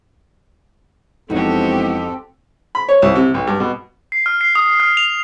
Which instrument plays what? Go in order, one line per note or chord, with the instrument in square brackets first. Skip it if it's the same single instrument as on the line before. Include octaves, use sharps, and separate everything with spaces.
[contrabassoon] E1 [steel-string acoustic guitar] F2 D#4 [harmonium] C4 A4 [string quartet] F#4 G4
[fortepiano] B5
C#5
C2
C3
B1
G2
B2
[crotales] C7
F6
C7
D#6
F6
F7